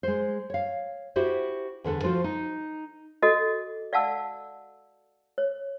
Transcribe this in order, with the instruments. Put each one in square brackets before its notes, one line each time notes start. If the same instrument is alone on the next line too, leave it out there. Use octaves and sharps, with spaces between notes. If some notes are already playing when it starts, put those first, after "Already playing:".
[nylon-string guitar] G#3 C5
C#5 F5
E4 F#4 G4 C5
E2 D3 A4 B4
F3 F4 F#4 C5
D#4
[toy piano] F#4 A4 D#5 D6
D5 F5 F#5 A5 E6
C#5